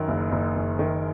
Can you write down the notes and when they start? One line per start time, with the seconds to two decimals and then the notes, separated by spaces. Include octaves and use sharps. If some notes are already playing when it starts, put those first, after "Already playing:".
Already playing: F#2 D#3
0.08 F#1
0.32 F#1
0.55 F#1
0.79 D#3